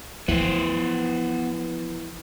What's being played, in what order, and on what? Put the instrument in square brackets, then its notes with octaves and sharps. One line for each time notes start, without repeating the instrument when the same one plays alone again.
[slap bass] E3 [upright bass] F3 [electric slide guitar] B3 C5